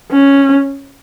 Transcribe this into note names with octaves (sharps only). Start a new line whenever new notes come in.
C#4